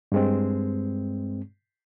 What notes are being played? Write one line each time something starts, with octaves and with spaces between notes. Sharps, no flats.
G2 G#3 C4